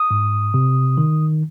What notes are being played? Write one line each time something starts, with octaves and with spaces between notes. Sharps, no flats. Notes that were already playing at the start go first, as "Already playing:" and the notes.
Already playing: D#6
G#2
C3
D#3